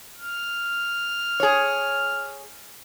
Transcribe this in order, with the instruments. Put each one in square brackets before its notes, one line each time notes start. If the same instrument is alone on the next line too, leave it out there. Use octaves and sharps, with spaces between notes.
[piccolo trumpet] F6
[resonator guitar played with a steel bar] G#4 C#5